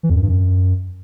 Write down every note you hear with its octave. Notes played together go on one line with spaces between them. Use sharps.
E3
F2
F#2
G2
F#2